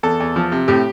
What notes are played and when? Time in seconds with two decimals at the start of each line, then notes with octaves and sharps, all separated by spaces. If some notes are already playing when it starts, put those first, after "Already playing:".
0.03 E2 A4
0.20 E2
0.36 F3
0.52 C3
0.68 A2 G4